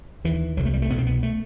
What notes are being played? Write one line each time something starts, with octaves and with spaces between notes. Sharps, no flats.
D#2 E3
C2 C3 F#3
A3
G3
A3
C2 B2 B3
C4
B3
A3